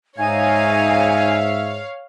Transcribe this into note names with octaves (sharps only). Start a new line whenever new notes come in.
G#2 D#4 C#5 E5 F5 G#5 G#6